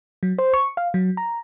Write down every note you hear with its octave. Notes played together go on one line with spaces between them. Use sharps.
F#3
C5
C#6
F5
F#3
A#5